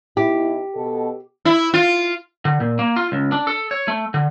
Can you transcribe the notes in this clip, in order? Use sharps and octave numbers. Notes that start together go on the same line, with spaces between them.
B2 D#4 E4 G4
B2 A4
E4
F4
D3
A#2
A#3
F4
C#2
D4
A4
C#5
A3
D3